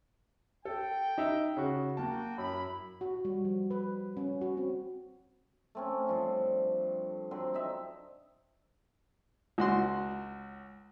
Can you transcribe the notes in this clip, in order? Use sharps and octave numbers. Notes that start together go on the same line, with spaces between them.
A4 G5
D#4 E5 E6
C#3 F#4
A#3 F#4 G5 A5
F#2 E4 B5
F#4
G3
F3
B4
C#4
F#4
C4
A3 C4 C#4
G2 F3 D4
D3 F#3 C4
C4 D#4 E5
C#2 F#4 C6